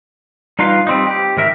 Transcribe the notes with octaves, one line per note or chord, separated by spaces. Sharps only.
G3 D#4 F4 B4 F5
G3 C4 D#4
G4
G#2 D#3 A#4 E5